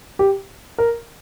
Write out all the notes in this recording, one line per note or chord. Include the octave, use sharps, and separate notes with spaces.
G4
A#4